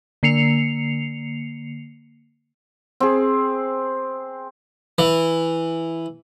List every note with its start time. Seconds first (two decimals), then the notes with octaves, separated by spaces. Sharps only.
0.23 D3 A#3 C7 C#7 F7
3.00 C4 G#4
4.98 E3